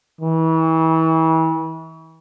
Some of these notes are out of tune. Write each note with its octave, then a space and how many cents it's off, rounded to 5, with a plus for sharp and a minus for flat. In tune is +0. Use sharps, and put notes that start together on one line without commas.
E3 -35